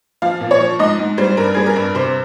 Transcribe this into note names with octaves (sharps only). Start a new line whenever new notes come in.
F3 F5
A#2
C#5
F3
G#2 D#5
G#2
G3 C5
G2 A#4
G3 G#4
A#4
G2
C3 C5